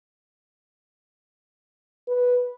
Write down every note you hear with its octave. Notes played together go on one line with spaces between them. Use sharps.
B4